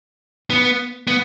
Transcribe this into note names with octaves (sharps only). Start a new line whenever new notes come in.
B3
B3